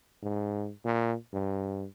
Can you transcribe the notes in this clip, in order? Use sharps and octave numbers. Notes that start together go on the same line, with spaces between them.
G#2
A#2
G2